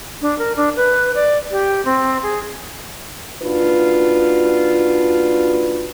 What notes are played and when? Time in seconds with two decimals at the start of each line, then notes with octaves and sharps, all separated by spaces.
0.22 D4
0.38 A#4
0.56 D4
0.76 B4
1.15 D5
1.51 G4
1.85 C4
2.22 G#4
3.42 D#2 D4 F4 F#4 B4